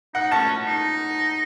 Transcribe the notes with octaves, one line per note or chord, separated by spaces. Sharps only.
D#4 F#5
C#4 A5
D#4